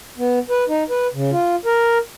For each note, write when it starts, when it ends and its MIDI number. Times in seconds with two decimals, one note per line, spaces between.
0.18 0.39 59
0.50 0.64 71
0.68 0.83 63
0.90 1.07 71
1.14 1.31 49
1.31 1.55 65
1.65 1.98 70